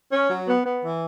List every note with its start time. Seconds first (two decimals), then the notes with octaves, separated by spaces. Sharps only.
0.12 C#4
0.30 F#3
0.47 B3
0.65 B3
0.83 E3